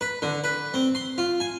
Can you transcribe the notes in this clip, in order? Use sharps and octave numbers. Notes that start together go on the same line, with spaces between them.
B4
D3
B4
C4
C6
F4
G#5